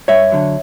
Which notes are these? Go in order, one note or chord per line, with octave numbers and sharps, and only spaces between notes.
G2 C#5 E5
D3 F#3